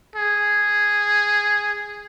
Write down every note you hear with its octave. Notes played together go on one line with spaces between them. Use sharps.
G#4